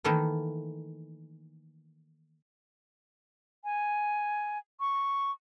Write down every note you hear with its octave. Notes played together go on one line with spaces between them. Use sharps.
D#3 E3 A3 A#3 A4 A#4
G#5
C#6